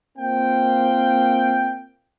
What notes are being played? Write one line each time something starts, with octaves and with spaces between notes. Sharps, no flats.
A#3 C4 F4 C5 F5 G5